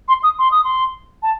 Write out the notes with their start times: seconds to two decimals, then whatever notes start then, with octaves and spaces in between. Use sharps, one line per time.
0.08 C6
0.23 D#6
0.39 C6
0.51 D#6
0.64 C6
1.23 A5